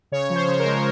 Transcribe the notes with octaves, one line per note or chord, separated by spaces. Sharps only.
C#3 C#5
F3
C5
C#3
A#4
G#3